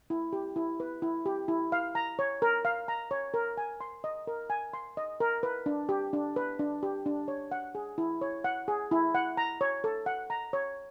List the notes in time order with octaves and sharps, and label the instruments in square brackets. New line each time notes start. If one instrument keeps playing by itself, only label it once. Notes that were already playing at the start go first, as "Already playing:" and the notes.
[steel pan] E4
G4
E4
B4
E4
G4
E4
F5
A#5
C#5
A#4
F5
A#5
C#5
A#4
G#5
C6
D#5
A#4
G#5
C6
D#5
A#4
B4
D4
G4
D4
B4
D4
G4
D4
C#5
F#5
G#4
E4
C#5
F#5
G#4
E4
F#5
A#5
C#5
A4
F#5
A#5
C#5